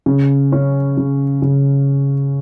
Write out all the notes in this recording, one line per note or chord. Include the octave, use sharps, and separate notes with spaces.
C#3
C#4
C#3
C#3